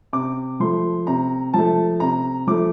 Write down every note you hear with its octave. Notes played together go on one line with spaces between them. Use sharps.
C3 D6
F3 A3 C6
C3 A#5
F3 A3 A5
C3 A#5
F3 A3 D6